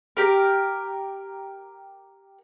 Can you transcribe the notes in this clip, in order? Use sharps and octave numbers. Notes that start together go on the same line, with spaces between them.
G4 A#4